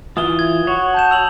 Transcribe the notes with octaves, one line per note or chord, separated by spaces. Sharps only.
E3 E4 F4 D#6 G7
G#6
F#4 C#5
A5 G6 E7
E6 F7 F#7